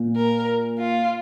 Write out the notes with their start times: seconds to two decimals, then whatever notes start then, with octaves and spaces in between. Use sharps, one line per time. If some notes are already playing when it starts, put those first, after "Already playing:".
Already playing: A#2
0.16 A#4
0.79 F4